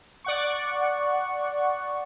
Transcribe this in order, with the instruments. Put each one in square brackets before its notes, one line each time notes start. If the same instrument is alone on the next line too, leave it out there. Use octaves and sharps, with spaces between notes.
[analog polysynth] D5 F#5 C#6